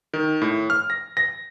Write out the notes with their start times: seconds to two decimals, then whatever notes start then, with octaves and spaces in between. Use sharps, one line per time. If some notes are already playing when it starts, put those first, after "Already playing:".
0.13 D#3
0.42 A2
0.70 F6
0.90 A#6
1.17 A#6